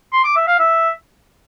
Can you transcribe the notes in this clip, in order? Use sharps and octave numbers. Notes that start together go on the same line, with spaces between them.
C6
D6
E5
F5
E5